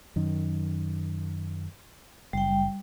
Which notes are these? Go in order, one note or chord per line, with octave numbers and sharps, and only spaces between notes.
F#2 D#3
F#1 G3 G5